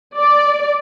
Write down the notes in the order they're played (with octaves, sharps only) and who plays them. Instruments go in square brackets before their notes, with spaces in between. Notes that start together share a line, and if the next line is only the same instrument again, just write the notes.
[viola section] D5